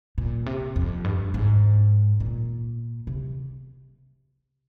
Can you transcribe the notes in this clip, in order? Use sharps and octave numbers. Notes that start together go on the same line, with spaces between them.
A#2
C3
F2
G2
G#2
A#2
C3